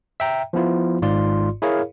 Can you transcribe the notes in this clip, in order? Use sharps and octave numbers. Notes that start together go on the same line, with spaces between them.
E5 G5 A#5
F3 B3 E4 F4
G#1 G#2 F4 D5 C6
E4 G#4 A#4 C#5 F5